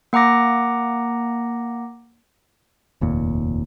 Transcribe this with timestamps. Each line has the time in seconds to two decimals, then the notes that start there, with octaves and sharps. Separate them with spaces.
0.13 A#3 F#5 A#5 D6 A#6
3.01 F1 D#2 A#2